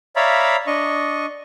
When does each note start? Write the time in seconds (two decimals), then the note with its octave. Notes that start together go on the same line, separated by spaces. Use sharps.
0.16 C#5 D5 E5 F5 A#5 B5
0.67 D4 D#5 C#6